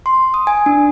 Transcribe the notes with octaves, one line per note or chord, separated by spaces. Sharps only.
C6
D#6
G#5
D4